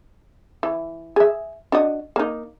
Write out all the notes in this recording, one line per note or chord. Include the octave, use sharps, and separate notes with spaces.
E3
G#4 E5
D4 F#4 D#5
A#3 D#4